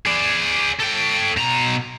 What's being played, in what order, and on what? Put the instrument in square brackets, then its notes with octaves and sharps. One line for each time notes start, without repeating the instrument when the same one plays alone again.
[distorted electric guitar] G#4 D5
A4 G5
B2 A#5